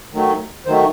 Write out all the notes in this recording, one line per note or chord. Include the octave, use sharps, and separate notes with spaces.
D#3 F#3 A3
D#3 F#3 A3 C5